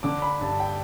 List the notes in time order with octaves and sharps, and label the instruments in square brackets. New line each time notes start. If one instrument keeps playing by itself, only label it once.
[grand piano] D3 D6
B5
G2 A5
G5